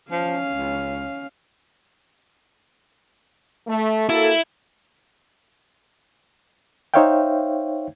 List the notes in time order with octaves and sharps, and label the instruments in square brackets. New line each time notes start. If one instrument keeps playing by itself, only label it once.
[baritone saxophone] F3 [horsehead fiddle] C#4 F5
[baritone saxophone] C#2
[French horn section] A3
[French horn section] A#3 F#4 A4 [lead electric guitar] E4
[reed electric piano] D#4 C5 C#5 E5 F5 G5